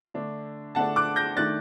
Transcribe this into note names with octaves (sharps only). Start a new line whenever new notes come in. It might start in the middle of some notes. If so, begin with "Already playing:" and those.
D3 A3 D4
D3 A3 D4 F#5 A5
D6 F#6
G6 A#6
D#3 A3 D4 F#6 A6